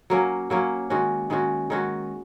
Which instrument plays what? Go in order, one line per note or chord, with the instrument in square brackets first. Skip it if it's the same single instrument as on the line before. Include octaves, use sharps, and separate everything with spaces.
[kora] F#3 A#3 C#4
F#3 A#3 C#4
D#3 G#3 C#4 F#4
D#3 G#3 C#4 F#4
D#3 G#3 C#4 F#4